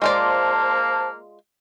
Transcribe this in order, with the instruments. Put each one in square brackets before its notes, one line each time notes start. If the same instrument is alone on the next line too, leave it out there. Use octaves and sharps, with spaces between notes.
[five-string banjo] G#3 F4 D5 [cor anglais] A#3 [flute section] C5 A5